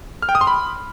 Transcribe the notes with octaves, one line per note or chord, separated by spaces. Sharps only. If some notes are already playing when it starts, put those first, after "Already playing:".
F6
G5
D#6
C6
B5